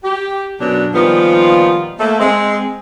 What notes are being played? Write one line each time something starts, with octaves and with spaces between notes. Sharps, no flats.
G4
F#2 B2 F#3 D4
A#2 D#3 F3 G3 B3 F4
A3 A#3
G#3 C4